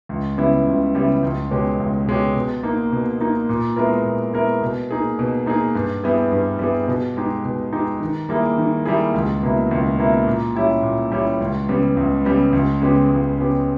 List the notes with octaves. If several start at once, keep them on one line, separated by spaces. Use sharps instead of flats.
C#2
C#3 G3 B3 E4
C#2
C#3 G3 B3 E4
C#2
B2 G#3 C#4 G4
C#2
B2 G#3 C#4 G4
B2
A#3 D#4
B2
A#3 D#4
A#2
G#3 B3 E4 A#4
A#2
G#3 B3 E4 A#4
B2
A#3 D#4 G#4
B2
A#3 D#4 G#4
G2
G3 B3 E4 G#4
G2
G3 B3 E4 G#4
B2
G#3 D#4 G4
B2
G#3 D#4 G4
D#3
G3 A#3 E4 G#4
D#3
G3 A#3 E4 G#4
C#2
B2 A#3 E4
C#2
B2 A#3 E4
A#2
G3 C#4 E4 G4
A#2
G3 C#4 E4 G4
C#2
C#3 G3 B3
C#2
C#3 G3 B3
C#2
C#3 G#3 B3 G4
C#2
C#3 G#3 B3 G4